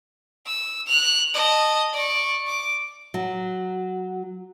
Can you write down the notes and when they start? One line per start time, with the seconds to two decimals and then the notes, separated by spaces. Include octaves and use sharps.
0.46 E6
0.86 F#6 F7
1.34 D#5 A5
1.93 D5 C#6
2.47 D6
3.14 F#3